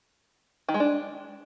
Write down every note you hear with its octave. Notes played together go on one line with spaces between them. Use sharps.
D#3
G#3
D4